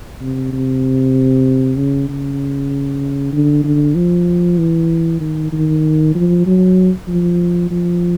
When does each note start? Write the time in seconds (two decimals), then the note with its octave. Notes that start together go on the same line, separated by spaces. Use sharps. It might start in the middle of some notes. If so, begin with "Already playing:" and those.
0.21 C3
0.52 C3
1.76 C#3
2.09 C#3
3.32 D3
3.64 D3
3.95 F3
4.58 E3
5.20 D#3
5.52 D#3
6.15 F3
6.46 F#3
7.08 F3
7.70 F3